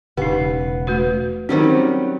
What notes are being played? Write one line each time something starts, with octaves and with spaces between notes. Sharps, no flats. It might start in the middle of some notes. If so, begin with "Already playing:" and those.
E1 C#3 B3 D#4 G4
A3 F#4 B4
D#3 F#3 G3 C4 C#4 C5